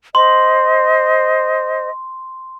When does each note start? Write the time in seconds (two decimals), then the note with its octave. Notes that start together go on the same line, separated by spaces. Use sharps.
0.15 C5 D#5 C6